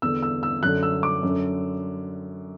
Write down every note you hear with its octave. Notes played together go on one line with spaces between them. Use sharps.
E2 D3 E6
E6
E6
F#2 D3 F#6
E6
D6
F#2 D3